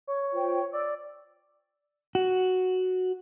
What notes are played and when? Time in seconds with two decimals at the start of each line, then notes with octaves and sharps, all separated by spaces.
0.07 C#5
0.33 F4 C5 G5
0.73 D5 E6
2.15 F#4